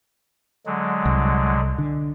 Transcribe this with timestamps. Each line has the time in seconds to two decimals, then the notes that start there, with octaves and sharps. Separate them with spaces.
0.66 D3 F#3 G#3
1.05 C2
1.78 D3